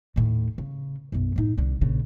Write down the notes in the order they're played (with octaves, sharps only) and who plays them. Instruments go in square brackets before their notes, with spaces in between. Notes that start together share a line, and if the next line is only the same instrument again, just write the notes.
[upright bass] D#2 A2
C#3
B1 F#2
A2 D#4
C2 D3
A#1 C#3